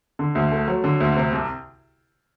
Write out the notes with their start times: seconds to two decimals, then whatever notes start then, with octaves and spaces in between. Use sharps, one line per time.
0.19 D3
0.35 D2
0.52 A3
0.68 F#3
0.84 D3
1.00 D2
1.16 C3
1.32 C2